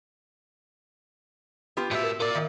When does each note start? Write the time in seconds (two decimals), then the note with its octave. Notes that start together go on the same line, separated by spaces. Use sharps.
1.77 B3 F4 G4
1.91 A2 F#4 E5
2.03 A#4
2.20 F4 A#4 D5
2.35 D#3 E5